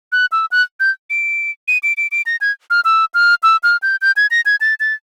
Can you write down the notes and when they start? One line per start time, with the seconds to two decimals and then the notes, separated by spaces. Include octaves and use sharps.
0.12 F#6
0.32 E6
0.52 F#6
0.80 G6
1.10 D7
1.68 D#7
1.83 D7
1.97 D7
2.12 D7
2.26 A#6
2.41 G#6
2.70 F6
2.85 E6
3.14 F6
3.43 E6
3.63 F6
3.82 G6
4.01 G6
4.17 G#6
4.31 A#6
4.46 G#6
4.61 A6
4.80 A6